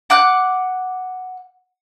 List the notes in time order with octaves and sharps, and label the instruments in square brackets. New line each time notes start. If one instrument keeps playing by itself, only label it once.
[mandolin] F#5 D6 F#6